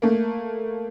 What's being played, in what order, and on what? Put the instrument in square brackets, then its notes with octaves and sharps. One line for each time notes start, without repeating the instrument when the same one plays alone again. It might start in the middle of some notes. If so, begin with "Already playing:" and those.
[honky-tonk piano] A3 A#3